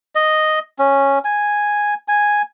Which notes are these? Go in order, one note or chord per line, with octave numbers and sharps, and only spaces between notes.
D#5
C#4
G#5
G#5